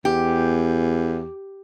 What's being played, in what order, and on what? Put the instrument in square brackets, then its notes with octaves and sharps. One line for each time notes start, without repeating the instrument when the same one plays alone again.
[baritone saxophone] E2 [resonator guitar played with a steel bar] G4